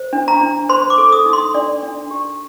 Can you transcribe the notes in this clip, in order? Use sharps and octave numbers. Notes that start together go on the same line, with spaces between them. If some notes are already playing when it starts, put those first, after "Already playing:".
Already playing: C5
D4
A#5
D4
C5 C6
D6
A4
D#6
D#4
C6
D4 D5
D4
G4